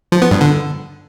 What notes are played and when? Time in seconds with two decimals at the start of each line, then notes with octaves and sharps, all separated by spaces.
0.12 F3
0.22 B3
0.31 G2
0.41 D3